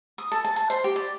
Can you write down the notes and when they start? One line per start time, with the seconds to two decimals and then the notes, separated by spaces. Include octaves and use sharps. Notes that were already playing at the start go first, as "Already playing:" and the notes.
0.18 D#6
0.32 A4
0.45 A5
0.56 A5
0.70 C5
0.84 G4
0.96 D5